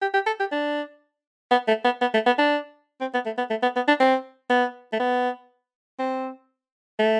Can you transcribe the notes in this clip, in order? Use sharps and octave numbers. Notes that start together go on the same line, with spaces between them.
G4
G4
A4
G4
D4
B3
A3
B3
B3
A3
B3
D4
C4
B3
A3
B3
A3
B3
B3
D4
C4
B3
A3
B3
C4
A3